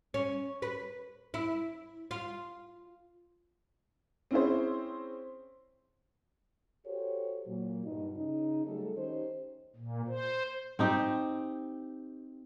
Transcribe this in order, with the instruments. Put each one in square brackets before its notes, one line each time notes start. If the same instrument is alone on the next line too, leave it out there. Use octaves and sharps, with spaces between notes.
[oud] C#4
B4
E4
F4
[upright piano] C4 C#4 E4 G#4 C5
[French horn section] F#4 G4 A4 C5 C#5
A#2 F#3
G2 B2 D#4
C#3 D#4
F#3 G3 A3 G#4 A4
D#3 C#4 D#4 G4 C5
[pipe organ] A#2
C5
[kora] C4 D#4 G4